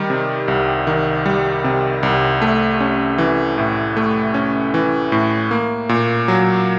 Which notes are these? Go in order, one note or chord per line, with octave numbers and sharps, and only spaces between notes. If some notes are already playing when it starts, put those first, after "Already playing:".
Already playing: D#3 G3
C3
C2
D#3
G3
C3
C2
A3
C#4
E3
A2
A3
C#4
E3
A2
A#3
A#2
F#3